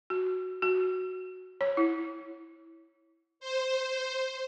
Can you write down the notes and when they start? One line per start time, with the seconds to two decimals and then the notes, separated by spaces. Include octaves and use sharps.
0.10 F#4
0.62 F#4
1.61 C#5
1.77 E4
3.40 C5